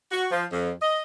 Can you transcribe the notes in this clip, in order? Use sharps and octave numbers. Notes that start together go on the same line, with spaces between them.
F#4
F3
F2
D#5